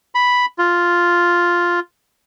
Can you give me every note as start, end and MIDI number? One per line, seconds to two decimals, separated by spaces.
0.15 0.46 83
0.58 1.80 65